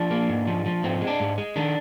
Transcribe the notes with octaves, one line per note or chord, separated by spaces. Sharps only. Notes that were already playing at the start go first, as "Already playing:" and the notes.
Already playing: F3 D4
A#3
G#2
F3
F3
G#2 C4
G#3
D4
G#2
G#3
D#3 D4